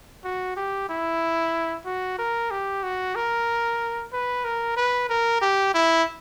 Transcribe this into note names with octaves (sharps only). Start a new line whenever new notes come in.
F#4
G4
E4
F#4
A#4
G4
F#4
A#4
B4
A#4
B4
A#4
G4
E4